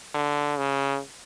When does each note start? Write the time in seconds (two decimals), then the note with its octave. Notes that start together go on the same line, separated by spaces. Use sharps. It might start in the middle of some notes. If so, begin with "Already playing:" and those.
0.15 D3
0.58 C#3